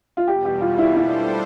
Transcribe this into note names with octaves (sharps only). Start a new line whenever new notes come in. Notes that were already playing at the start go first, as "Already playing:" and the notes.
F4
E2 B2 G3 G4
G4
F4
E4
G3 D4 E4 A4 C5